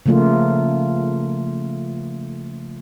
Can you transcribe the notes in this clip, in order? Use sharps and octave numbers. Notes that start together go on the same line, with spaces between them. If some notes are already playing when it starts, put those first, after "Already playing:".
C#3 F3 A3 A#3 F4